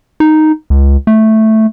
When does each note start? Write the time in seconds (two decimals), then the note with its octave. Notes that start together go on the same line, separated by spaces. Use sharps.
0.20 D#4
0.70 C#2
1.07 A3